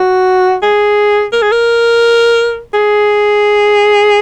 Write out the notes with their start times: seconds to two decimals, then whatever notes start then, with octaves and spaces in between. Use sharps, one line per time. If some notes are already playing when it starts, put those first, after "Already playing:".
Already playing: F#4
0.62 G#4
1.33 A#4
1.42 G#4
1.52 A#4
2.74 G#4